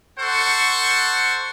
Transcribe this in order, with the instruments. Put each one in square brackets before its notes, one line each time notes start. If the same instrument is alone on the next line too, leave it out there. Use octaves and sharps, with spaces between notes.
[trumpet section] A4 C5 F#5 C#6